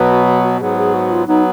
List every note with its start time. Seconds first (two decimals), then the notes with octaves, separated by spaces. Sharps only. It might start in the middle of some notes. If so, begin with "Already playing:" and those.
Already playing: B2 F#3 B3
0.10 F#4
0.27 F#4
0.43 F#4
0.60 G#2 F#3 B3 G#4
0.77 G#4
0.94 F#4
1.11 F4
1.27 F#3 B3 D#4